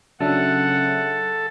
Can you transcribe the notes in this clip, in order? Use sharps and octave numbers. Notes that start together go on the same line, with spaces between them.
C#3 F#3 D4 A4 E5 F#5